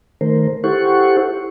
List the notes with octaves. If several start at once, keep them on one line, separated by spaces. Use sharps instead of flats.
D#3 A3 A#4 C5
E4 G4 A4 C5 F#5 C#6